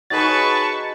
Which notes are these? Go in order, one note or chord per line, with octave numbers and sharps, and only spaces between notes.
F#3 D#4 G#4 B4 A5 C#6 A6